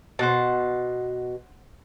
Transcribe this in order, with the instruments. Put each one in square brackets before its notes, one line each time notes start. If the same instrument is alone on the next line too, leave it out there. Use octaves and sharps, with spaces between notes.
[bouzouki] B2 [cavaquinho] C5 F#5 A5